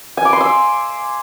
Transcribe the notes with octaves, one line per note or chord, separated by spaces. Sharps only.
G#5
D6
C6
E6